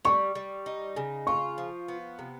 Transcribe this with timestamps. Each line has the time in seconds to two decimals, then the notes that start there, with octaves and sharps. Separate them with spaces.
0.05 G3 C#6
0.35 G3
0.66 D#4
0.96 C#3
1.27 F4 C#6
1.58 F3
1.88 B3
2.19 C3